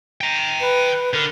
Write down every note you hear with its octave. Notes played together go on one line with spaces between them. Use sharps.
G5 A#5
B4
D3 A#4